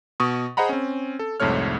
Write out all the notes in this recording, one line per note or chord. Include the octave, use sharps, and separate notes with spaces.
B2 C#6 D#6
G#4 C5 D#5 F#5 A#5 B5
C4 C#4
A4
C2 F2 G#2 A3 C#5 F6